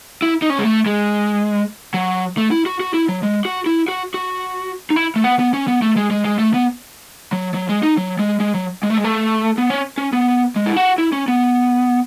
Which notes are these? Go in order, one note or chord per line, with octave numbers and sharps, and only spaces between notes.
E4
D#4
C#4
G#3
A3
G#3
F#3
A3
E4
F#4
F#4
E4
F#3
G#3
F#4
E4
F#4
F#4
D#4
E4
A3
B3
B3
C#4
B3
A3
G#3
G#3
G#3
A3
B3
F#3
F#3
G#3
D#4
F#3
G#3
G#3
F#3
G#3
A3
G#3
A3
B3
C#4
C#4
B3
G#3
E4
F#4
E4
C#4
B3